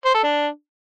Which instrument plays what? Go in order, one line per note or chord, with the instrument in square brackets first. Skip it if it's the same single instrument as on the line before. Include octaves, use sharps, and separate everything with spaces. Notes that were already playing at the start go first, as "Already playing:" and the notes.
[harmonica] C5
A4
D4